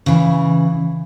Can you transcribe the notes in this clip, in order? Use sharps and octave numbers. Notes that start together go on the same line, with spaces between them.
C#3 E3